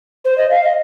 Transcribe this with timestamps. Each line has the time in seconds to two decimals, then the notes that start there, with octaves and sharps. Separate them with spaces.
0.25 C5
0.38 D#5
0.51 F5
0.64 D#5